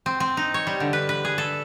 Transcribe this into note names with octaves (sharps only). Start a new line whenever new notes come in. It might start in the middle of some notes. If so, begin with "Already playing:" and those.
C4
C4
D#4
C#5
G3
D3
B4
B4
G#4
A4